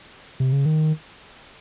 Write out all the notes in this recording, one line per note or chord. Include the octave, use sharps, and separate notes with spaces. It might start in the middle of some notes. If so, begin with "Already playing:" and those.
C3
C#3
D#3